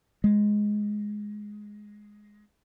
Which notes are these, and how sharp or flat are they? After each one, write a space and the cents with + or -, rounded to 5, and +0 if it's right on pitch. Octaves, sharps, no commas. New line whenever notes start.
G#3 +5